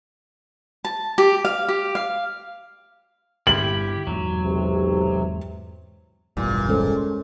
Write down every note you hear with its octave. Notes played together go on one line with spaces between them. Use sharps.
A5
G4
F5
G4
F5
G2 D3 D4 E4 G4 F#7
E2 G#2 F#3
B1 C3
E1 A1 G2 A#2
G#3 C#4 A4 C5